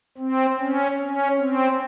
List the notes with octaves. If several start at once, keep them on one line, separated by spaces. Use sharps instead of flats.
C4
C#4
C#4
C4